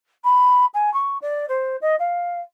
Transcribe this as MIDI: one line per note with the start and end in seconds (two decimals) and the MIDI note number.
0.24 0.65 83
0.74 0.92 80
0.93 1.18 85
1.21 1.45 74
1.48 1.76 72
1.81 1.95 75
1.99 2.40 77